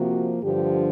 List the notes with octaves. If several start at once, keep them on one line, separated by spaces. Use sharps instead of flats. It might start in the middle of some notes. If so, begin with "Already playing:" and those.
Already playing: C3 F3 A#3 F#4
G2 D3 F3 G4